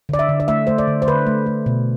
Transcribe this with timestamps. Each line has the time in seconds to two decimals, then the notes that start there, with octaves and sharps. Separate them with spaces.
0.09 D3 D5
0.19 E5
0.29 D3
0.40 D5
0.48 A3 E5
0.67 A3 C5
0.78 D5
0.87 D3
1.02 C5
1.07 D3 B4
1.27 A3
1.46 A3
1.66 B2